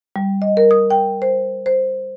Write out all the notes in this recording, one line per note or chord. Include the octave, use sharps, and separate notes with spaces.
G3
D#5
A#4
D#6
G5
C5
C5